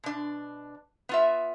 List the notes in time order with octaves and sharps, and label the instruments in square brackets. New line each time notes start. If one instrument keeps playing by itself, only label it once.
[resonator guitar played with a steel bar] B2 D4
B3 F4 E5